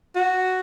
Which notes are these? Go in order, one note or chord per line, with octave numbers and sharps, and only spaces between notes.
F#4